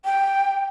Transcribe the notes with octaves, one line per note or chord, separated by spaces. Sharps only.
G5